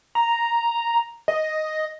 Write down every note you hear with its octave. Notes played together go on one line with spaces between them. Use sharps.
A#5
D#5